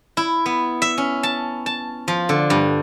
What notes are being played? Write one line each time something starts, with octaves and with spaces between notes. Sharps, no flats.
E4
B3
E5
C#4
A5
A5
F3
D3
G2